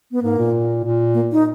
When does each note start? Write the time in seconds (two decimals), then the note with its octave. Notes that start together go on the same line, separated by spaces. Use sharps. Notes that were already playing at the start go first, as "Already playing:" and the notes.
0.11 B3
0.23 G#2 A#3
0.38 A#2
0.84 A#2
1.14 A#3
1.32 D#4